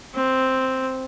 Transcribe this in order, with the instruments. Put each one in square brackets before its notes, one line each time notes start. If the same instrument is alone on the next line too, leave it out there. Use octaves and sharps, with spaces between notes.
[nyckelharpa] C4